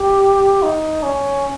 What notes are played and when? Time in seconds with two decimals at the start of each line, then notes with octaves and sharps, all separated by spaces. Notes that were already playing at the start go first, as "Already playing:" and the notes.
Already playing: G4
0.63 D#4
1.03 C#4